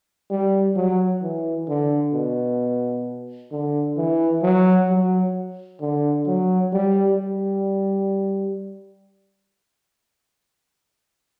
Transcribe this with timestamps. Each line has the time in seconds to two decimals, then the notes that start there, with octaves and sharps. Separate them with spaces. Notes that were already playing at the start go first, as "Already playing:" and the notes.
0.30 G3
0.76 F#3
1.22 E3
1.68 D3
2.14 B2
3.52 D3
3.97 E3
4.43 F#3
4.89 F#3
5.81 D3
6.27 F#3
6.73 G3
7.18 G3